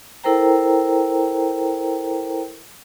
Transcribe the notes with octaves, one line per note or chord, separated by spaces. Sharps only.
E4 A4 A#4 C5 G5 A#5